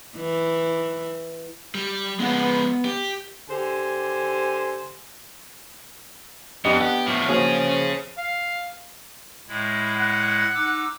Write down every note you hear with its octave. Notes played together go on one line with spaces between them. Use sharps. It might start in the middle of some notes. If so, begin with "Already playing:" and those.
E3
G3
F3 G#3 B3 F#5
G4
D3 G4 C5 G#5
F2 B3 D4 G4 D#5
G4 F#5
A2 F3
F3 A#3 C#4 F#4 G#4 C#5
F5
A2 G#3 E4
F#5
D#4 D6 E6